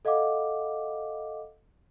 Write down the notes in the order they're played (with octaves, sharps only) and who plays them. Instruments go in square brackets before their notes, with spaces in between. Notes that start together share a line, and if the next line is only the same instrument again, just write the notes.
[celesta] A4 D#5 F5 F#5 D6